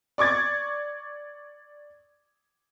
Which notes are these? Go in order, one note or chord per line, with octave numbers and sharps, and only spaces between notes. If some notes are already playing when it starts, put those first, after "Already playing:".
D5 C#6 D6 G#6 A6